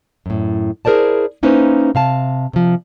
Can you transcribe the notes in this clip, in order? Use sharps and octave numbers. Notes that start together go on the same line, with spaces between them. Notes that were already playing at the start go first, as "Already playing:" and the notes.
F#2 A2
E4 G#4 A#4 C5 D5 A5
A#3 C#4 D#4 E4 B4 C5
C3 F5 A5
C3 F3